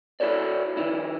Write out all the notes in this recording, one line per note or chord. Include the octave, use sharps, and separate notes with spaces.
E4 F#4 A4 C#5 D5
D#3 D#4 E4